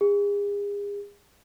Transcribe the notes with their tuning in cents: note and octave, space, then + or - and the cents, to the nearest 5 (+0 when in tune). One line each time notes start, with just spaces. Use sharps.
G#4 -40